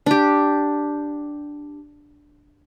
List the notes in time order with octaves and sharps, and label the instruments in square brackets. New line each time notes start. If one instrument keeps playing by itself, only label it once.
[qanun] D4 G4